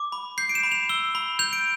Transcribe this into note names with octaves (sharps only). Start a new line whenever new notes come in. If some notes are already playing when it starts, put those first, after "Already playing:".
Already playing: D6
B5
G6 C7
D7
E7
B5
F7
E6 G7
B5
G6 F7
D7